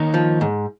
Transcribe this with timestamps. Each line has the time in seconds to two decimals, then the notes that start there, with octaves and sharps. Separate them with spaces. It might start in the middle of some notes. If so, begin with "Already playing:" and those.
Already playing: D#3 A#3 D#4 A#4 C#5
0.14 F3
0.41 G#2